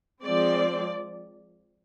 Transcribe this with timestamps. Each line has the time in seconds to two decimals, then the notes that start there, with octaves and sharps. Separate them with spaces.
0.24 F3 G#3 C4 D5